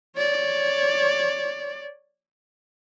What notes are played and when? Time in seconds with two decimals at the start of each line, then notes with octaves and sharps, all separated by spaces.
0.16 C#5 D5